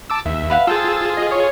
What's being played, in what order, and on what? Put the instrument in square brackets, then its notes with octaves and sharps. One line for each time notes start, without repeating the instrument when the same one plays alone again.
[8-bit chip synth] A5 D6 E6
[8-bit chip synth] D#2 [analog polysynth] E5
[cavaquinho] B4 F5 F#5
[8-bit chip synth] F4 G#4 [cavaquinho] A4 C5 G5 [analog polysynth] E6 A6
[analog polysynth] D#5
C#5